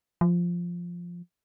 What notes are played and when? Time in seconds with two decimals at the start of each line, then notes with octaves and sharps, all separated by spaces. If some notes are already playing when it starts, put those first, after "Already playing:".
0.21 F3